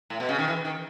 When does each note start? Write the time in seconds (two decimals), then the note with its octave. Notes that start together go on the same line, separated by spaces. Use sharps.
0.10 A2
0.20 B2
0.29 C#3
0.39 D#3
0.48 E3
0.65 D#3